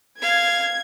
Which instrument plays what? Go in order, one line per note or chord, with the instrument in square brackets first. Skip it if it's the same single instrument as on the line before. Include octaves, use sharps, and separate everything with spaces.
[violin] F5 [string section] G#6